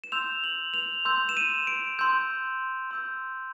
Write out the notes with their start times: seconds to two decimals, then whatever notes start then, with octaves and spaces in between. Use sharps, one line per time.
0.04 E7
0.12 C6 E6 G6 F7
0.44 F#7
0.74 F7
1.05 C6 E6 G6
1.29 E7
1.37 D#7
1.67 D7
1.99 C6 E6 G6
2.91 C6 E6 G6